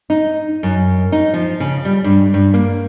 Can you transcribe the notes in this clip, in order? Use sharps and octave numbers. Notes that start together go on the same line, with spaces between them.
D#4
F#2
D#4
F3
C#3
G3
G2
G2
A#3